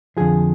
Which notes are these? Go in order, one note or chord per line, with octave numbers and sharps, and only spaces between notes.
F2 D3 F3 G#4